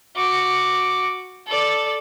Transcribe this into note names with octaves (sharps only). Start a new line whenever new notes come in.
F#4 D6
A4 D5